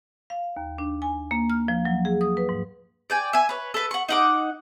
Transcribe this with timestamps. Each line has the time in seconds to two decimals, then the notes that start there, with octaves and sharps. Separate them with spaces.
0.30 F5
0.57 D#2
0.78 D4
1.02 G#5
1.31 A#3
1.50 F6
1.68 F3
1.85 F#3
2.05 G#4
2.21 D#6
2.37 B4
2.49 G#2
3.10 D5 G5 G#5
3.33 E5 G#5
3.49 B4 C#5
3.74 A4 B4
3.91 F#5 C#6
4.09 D#4 F#5 D6